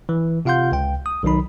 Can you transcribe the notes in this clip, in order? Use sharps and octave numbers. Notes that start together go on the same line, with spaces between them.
E3
C3 F4 F5 F#5 C6 G6
C#2 G5
D#6
B1 D#3 F#3 D#4 B5